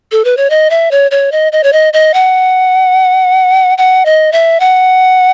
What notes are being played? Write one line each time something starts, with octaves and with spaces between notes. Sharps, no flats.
A4
B4
C#5
D#5
E5
C#5
C#5
D#5
D#5
C#5
D#5
D#5
F#5
F#5
D#5
E5
F#5